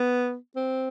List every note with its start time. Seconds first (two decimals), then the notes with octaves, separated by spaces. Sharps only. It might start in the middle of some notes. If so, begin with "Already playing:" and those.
Already playing: B3
0.56 C4